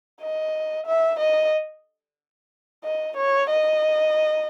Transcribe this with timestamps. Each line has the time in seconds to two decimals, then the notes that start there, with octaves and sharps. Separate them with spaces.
0.21 D#5
0.87 E5
1.20 D#5
2.84 D#5
3.17 C#5
3.50 D#5